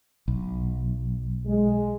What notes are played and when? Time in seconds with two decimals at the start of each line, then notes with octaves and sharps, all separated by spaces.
0.28 B1
1.47 G#3